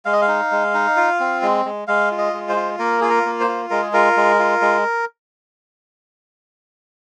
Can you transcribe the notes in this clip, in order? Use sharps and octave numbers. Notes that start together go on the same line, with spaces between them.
G#3 F5
D#5
F5
D#4
G#3
D#4
F4
C4
G#3
G#3
G#3 F5
F4
D#5
G#3
C5
F4
A#3 A#4
F4 G#4
A#4
A#3
C5
F4
G#3 A#4
G#4
F4 A#4
G#3
F4
G#3